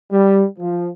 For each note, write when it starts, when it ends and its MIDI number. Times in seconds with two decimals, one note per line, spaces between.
0.12 0.44 55
0.58 0.88 53